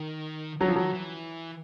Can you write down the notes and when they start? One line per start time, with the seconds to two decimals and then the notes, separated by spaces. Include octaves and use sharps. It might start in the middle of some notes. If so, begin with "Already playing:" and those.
Already playing: D#3
0.61 D3 F#3
0.68 F3
0.75 D#3 F#3
0.93 E3